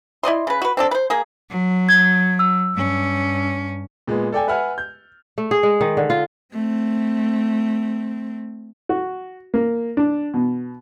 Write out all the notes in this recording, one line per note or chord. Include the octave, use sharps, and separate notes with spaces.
E4 D5 D#5 C6
C#3 B4
F#4 B4
C4 D4 A4
B4 C5
A#3 G#4
F#3
G#6
E6
G2 C#4
A#2 G#3 B3
A4 D5 G5 G#5
B4 E5 F#5 G#5 F6
G6
A3
G#4
G#3
D#3
D3
F4
A3 C4
F#4
A#3
D4
B2